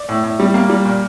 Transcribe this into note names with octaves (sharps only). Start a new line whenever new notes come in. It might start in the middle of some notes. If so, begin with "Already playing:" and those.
Already playing: D5
A2
A2
G3
A#3
G3
A#2